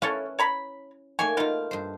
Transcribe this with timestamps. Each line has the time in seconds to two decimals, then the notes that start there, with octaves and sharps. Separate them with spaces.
0.02 C#4 E4 A4 B4 C#5 F5
0.39 C#5 A#5 B5
1.19 A3 A#3 D#4 C#5 G#5
1.37 B2 D#4 F4 F5 G5
1.71 G2 C5